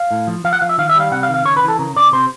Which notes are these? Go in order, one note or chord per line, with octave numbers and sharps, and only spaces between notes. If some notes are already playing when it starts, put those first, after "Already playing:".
Already playing: F5
A2
F3
F3 F5
F#5
F3 F5
E5
D#3 F5
E5
G3
F5
C3 F#5
F5
D#3
F5
C#3 C#5
B4
E3
A4
C#3 A#4
C#3 D5
C3 C5